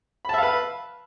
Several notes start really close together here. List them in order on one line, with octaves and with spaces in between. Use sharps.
B5 A5 E5 F5 B4